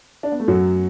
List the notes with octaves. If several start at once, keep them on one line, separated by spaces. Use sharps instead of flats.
D4
B3
A3
F#2 F#3